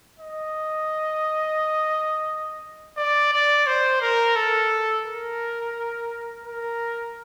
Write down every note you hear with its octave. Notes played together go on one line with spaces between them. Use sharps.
D#5
D5
D5
C5
A#4
A4
A#4
A#4